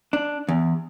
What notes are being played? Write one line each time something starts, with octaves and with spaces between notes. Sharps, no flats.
D4
E2